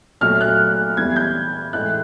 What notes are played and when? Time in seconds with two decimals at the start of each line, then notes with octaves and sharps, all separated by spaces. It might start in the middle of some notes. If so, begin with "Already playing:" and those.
0.21 A#2 F#3 A3 F6
0.41 F#6
0.97 E3 G3 B3 G#6
1.16 G6
1.73 A2 E3 G#3 F#6